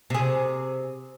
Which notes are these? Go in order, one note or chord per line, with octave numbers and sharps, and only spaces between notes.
C3 G#4